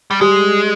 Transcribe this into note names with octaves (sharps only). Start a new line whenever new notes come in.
G3
G3 G#3